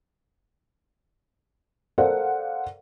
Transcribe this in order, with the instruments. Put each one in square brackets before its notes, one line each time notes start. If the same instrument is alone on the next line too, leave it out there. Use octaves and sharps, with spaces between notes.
[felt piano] A4 A#4 C5 D5 F5 F#5